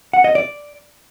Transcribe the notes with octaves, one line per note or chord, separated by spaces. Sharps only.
F#5
D#5
D5